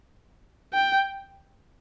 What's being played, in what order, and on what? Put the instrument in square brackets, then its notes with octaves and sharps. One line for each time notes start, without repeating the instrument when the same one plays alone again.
[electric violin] G5